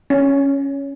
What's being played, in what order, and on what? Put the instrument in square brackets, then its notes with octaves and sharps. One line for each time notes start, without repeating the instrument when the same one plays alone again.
[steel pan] C#4